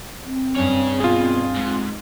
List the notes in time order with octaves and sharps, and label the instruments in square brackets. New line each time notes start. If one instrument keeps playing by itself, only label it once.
[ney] C4
[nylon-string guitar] G2 C#4 [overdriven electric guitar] G#4 C#5
[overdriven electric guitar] B2 [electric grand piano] F4 G#4
[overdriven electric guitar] G#2